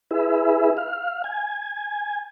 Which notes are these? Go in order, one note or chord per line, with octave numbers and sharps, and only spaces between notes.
E4 G#4 B4 E5
F5
G#5